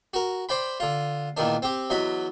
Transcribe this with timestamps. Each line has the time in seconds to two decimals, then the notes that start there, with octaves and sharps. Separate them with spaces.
0.14 F#4 A#4
0.49 C5 D5 G5 B5
0.80 D3 F4
1.37 E2 A#2 D#3 D4
1.62 C4 G4
1.90 E2 F#3 D#5 B5